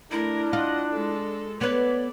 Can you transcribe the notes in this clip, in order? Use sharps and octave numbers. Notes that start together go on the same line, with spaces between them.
A3 D4 E4 A#4
F4 D#5 F#5
G#3 A4
B3 A4 B4 C#5 D5